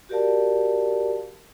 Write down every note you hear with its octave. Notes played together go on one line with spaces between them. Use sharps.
F#4 G4 A#4 D5 F5 A5